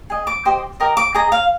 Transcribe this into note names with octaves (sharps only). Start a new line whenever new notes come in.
G#4 D#5
D6
G4 C5 D#5
G4 A#4 D#5
D6
G#4 D#5 A#5
F5